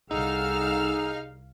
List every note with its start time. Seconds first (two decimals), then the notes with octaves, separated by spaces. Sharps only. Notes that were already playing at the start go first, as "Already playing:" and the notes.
0.11 C2 D#4 G#4 A4 F5 F#5 E6 F6